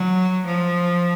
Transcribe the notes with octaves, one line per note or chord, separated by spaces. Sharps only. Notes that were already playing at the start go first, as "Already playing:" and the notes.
Already playing: F#3
F3